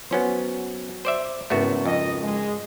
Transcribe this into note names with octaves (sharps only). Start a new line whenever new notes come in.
F#3 B3 C#4 C5
C5 D5 E5
G#1 A2 C#3 A3 B3 F#4
F2 D#5
G#3